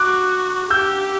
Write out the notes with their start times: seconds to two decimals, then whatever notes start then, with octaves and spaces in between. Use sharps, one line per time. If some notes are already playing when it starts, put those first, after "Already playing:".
Already playing: F#4 D6 F#6
0.70 G4 E6 G6